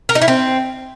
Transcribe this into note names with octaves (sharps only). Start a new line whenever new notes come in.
A#4
D#4
E4
C4